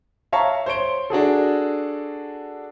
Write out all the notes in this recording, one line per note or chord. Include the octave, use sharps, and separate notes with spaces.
C#5 E5 F5 A5 A#5 C#6
C5 C#5 C6 D7 G7
D4 F#4 G#4 A4